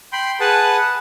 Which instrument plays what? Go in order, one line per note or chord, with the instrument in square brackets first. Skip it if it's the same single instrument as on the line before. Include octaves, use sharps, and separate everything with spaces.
[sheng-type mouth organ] G5 B5 C6
G#4 B4 F#5 A5